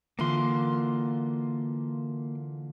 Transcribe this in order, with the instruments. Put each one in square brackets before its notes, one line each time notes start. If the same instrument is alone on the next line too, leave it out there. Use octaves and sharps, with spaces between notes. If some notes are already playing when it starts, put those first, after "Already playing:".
[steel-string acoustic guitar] D3 E3 F4 [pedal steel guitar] A#3 C6